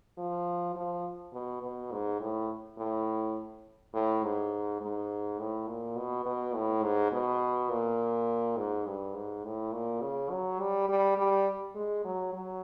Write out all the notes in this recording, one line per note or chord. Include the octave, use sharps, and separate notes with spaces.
F3
F3
B2
B2
G#2
A2
A2
A2
G#2
G#2
A2
A#2
B2
B2
A2
G#2
B2
A#2
G#2
G2
G#2
A2
A#2
C#3
F#3
G3
G3
G3
G#3
F#3
F#3